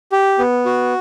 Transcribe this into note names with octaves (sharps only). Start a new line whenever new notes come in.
G4
B3
F#4